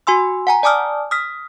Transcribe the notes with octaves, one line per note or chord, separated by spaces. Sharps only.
F#4 G#5 C6 E6
F#5 G#5 A#5
D5 G#5 A5 D6 D#6 F6
D#6 F6 B6